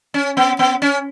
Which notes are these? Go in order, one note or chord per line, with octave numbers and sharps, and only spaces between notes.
C#4
B3
B3
C#4